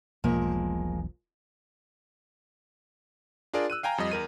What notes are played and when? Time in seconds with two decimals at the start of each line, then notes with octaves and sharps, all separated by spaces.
0.24 E1 B1 F3 G#3 A#3
3.53 D4 F4 G#4 A#4 D5
3.70 E6 F#6 D#7
3.83 F5 G5 G#5 A#5
3.98 F2 G3 D#5
4.12 E2 A#4 D#7